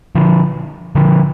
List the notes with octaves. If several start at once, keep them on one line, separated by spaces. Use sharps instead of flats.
D3 F3
D3 F3